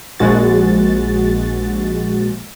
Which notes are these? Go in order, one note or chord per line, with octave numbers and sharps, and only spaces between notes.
A#1 G#3 F#4 A6